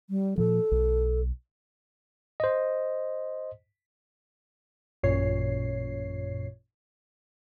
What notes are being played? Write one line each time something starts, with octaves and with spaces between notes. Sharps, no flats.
G3
A#2 F3 A4
B1
C5 D#5
A1 F#2 A#2 C#5 C7